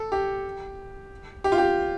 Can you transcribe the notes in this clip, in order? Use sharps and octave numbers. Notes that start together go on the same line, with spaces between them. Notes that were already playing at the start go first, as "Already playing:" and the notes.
Already playing: A4
G4
G4
F4
G4